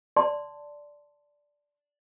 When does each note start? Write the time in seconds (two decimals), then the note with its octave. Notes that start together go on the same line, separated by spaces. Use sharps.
0.16 D5 A5 C6